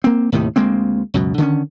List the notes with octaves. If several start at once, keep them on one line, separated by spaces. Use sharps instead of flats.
A#3 C4
D#2 A2 C3 D#3
D2 G#3 A#3 C4
C#2 F#2 B2
D3 D#3 A3 C#4